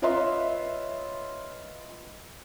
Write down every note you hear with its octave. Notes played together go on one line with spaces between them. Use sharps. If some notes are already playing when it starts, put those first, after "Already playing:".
F4 B4 C#5 D#5 E5 C6